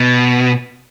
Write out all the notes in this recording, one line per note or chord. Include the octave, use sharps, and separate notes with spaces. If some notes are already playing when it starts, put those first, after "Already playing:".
Already playing: B2